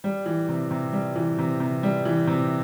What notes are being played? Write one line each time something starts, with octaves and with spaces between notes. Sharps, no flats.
G3
E3
C3
C3
G3
E3
C3
C3
G3
E3
C3